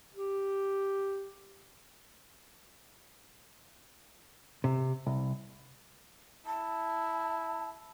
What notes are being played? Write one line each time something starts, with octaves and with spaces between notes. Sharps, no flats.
G4
C3
C2
E4 A5